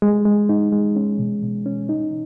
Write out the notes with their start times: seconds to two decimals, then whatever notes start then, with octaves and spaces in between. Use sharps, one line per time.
0.02 G#3
0.25 G#3
0.49 D#4
0.72 G#3
0.96 C#4
1.19 B2
1.43 B2
1.66 C#4
1.89 D#4